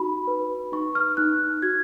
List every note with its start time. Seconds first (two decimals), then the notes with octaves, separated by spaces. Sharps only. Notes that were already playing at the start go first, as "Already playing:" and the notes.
Already playing: D#4 F#4 B5
0.27 B4
0.72 D#4 C#6
0.95 F6
1.17 D#4 F#6
1.62 F#4 G#6